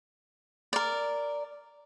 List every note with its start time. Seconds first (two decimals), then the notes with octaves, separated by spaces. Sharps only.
0.73 A#4 D5